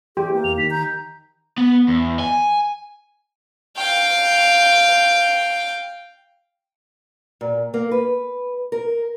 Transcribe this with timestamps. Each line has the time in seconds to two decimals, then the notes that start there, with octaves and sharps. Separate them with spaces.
0.17 E3 G4 G#4
0.32 A#3
0.44 E2 F7
0.58 D#3 B6
0.71 A#5 G6
1.58 B3
1.88 E2
2.20 G#5
3.77 F5 G5
7.41 A#2
7.74 A#3
7.91 B4
8.72 A#4